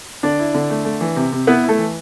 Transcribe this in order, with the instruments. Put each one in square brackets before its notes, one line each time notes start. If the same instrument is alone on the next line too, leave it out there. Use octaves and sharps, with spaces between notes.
[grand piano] D3 D4 D5
E4
D3
A3
A3
E3
C3
C3
B3 E4 B4
E4
A3 A4
E3